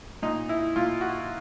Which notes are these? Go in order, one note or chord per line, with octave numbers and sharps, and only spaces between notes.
A#2 D#4
E4
A#2 F4
F#4